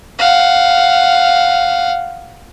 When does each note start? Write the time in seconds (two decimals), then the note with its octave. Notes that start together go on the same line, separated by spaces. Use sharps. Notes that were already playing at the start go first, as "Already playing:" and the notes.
0.18 F5 F#5